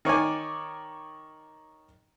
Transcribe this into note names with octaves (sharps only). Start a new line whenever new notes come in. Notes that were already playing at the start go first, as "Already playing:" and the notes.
D#3 C#5 D5 G#5